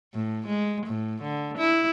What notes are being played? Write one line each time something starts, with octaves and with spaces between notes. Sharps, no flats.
A2
G#3
A2
D3
E4